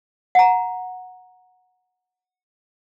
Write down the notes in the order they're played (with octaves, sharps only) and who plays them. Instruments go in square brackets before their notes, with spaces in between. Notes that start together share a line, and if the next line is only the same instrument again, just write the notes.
[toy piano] F#5 A#5